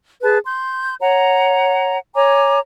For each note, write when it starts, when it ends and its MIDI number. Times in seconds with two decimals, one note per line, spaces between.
0.21 0.38 68
0.21 0.38 71
0.21 0.38 81
0.45 0.93 84
0.45 0.93 91
1.00 1.97 73
1.00 1.97 78
1.00 1.97 82
2.14 2.58 73
2.14 2.58 80
2.14 2.58 82
2.14 2.58 86